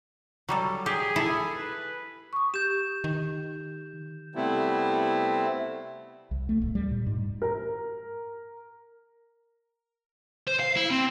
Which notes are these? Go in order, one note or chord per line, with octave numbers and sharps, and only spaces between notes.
F#3 G3 A4
G4 G#4
E4 A4
B4
C#6 D#6
G4 G6 E7
D#3
C3 G3 A3 B3 C4 E4
C2
A3
D1
G3
A#2
G#2
A#4
C5
F5
E4
C4